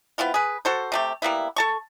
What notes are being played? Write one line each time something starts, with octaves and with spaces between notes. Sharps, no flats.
B3 C4 E4 F4
G#4 B4
F#4 A4 C5
C3 A3 G4
G3 A#3 B3 E4
A4 A5 C#6